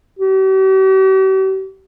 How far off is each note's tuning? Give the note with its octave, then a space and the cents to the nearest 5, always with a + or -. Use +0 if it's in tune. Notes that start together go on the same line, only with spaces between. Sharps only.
G4 -45